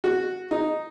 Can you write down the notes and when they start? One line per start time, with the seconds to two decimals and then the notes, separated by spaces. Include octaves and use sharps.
0.04 F#4
0.51 D#4